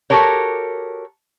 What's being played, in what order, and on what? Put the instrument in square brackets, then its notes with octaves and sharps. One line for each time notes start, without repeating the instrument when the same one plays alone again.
[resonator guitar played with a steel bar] F#4 G4 A4 A#4 C#5